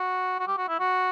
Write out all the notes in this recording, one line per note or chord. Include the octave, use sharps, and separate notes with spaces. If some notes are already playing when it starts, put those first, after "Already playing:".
Already playing: F#4
F#4
G4
F#4
E4
F#4